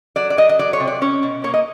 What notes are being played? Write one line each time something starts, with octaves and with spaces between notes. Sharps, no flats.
F#3 D5
D5
F#3 D#5
D#5
F#3 D5
C#5
C3
D5
C#4 C#5
B2
A#3 C#5
D#5